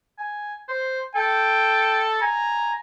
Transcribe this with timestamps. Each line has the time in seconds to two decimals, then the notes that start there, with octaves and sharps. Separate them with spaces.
0.18 G#5
0.69 C5
1.16 A4 G5
2.22 G#5 A#5